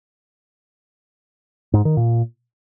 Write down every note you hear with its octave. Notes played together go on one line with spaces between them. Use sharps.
G#2
D#3
A#2